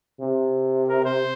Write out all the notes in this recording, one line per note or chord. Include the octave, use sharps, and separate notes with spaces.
C3
A#4
C5